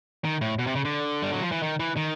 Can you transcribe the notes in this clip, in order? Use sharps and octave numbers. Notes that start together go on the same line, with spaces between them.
D#3
A2
B2
C3
C#3
D3
G3
F#3
F3
E3
D#3
E3
D#3